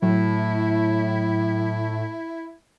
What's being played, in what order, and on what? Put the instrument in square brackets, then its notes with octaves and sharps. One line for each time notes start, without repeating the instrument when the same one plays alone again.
[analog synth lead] A2 [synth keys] F#3 [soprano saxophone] E4